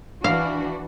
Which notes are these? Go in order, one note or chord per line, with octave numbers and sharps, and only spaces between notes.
E3 D4 F#4 F5